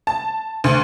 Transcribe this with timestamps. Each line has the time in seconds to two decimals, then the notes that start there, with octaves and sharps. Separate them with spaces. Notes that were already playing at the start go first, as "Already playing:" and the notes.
0.07 A5
0.64 D2